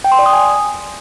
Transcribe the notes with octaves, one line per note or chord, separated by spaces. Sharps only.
G5
C6
D5
D#6
G#5